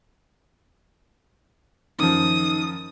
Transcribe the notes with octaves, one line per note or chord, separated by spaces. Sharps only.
F#2 D#3 F3 D#6